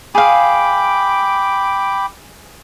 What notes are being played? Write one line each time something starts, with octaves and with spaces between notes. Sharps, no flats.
G#4 F5 G5 B5 D6